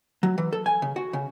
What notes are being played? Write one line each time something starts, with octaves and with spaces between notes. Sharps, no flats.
F#3
E3
A4
G#5
C#3
F#4
C#3